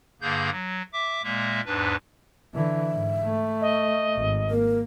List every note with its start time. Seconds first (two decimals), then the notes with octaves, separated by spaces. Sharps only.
0.21 G2 D3 A#3 G#4 G6
0.51 F#3
0.93 E5 D6
1.23 A#2 G#3 A#3 E5
1.66 E2 G#2 D4 B4
2.54 D3 E3 E5
2.92 G#2
3.25 A3
3.61 D#5
4.17 G#1
4.50 A#3 A#4